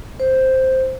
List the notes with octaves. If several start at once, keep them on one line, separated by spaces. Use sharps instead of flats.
C5